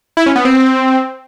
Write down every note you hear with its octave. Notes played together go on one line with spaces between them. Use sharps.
E4
C#4
B3
C4